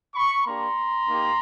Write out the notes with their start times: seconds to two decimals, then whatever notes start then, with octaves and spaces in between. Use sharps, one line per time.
0.15 B5 C#6
0.45 A#3 D4 G4 A#5 C6
1.08 A#3 D#4 G4